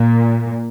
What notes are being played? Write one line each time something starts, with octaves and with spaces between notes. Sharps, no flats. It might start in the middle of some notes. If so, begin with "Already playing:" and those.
Already playing: A#2